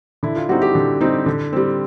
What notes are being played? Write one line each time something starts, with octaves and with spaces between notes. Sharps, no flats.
D3 E4
F4
G3 C4 D#4 F#4
G4
D3
G3 C4 D#4
D3
G3 C4